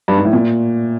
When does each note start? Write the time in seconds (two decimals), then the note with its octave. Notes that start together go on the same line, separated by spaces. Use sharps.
0.08 G2
0.17 G#2
0.25 A2
0.33 A#2